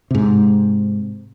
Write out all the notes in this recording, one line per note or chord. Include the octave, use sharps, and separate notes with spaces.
G#2 C3